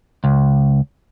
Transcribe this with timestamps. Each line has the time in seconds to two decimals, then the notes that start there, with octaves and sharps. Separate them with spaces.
0.24 C#2